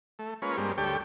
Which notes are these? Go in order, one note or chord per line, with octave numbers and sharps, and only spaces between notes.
A3
G#3 A#3 C#4 F4 B4 C#5
G2 G3 G#3 A#3 C4
D2 G3 G4 A4 C#5 G5